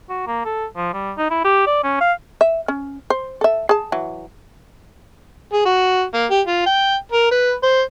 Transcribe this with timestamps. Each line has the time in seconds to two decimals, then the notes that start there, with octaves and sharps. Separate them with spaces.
0.10 F#4
0.27 A#3
0.45 A4
0.76 F3
0.94 G3
1.17 D#4
1.31 E4
1.44 G4
1.67 D5
1.84 C#4
2.01 F5
2.41 E5
2.68 C#4
3.10 C5
3.41 A4 E5
3.69 G#4 A5
3.92 E3 F#3
5.53 G#4
5.65 F#4
6.14 A#3
6.30 G4
6.47 F4
6.66 G5
7.12 A#4
7.31 B4
7.63 C5